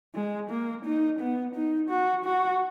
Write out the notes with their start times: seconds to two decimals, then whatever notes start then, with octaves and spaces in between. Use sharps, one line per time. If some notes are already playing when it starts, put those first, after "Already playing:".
0.15 G#3
0.50 A#3
0.85 D#4
1.19 B3
1.55 D#4
1.90 F#4
2.25 F#4